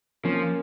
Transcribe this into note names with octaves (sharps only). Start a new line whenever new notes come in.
F3 A#3 C#4